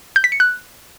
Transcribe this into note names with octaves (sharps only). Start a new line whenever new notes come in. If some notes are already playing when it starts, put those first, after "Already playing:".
G6
B6
C#7
F#6